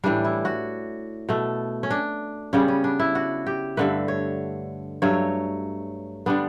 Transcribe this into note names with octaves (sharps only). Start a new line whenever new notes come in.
A2 E3 G3 D4
E4
F#4
B2 A3
C#4
D4
C#3 G3 B3 C#4
C#4
D4
E4
F#4
G4
G2 D3 A3 B4
C#5
G2 F#3 A3 C#5
D3 G3 B3 D4